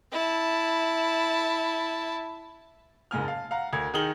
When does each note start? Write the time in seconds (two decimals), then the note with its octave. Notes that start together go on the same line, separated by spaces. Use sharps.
0.12 E4 A5
3.11 F#1 G#2 G#5 F6
3.24 F5 A5
3.51 F5 F#5 A#5
3.73 D2 A#4 G#6
3.94 D#3 D#4 G#4 F6 F#7 G7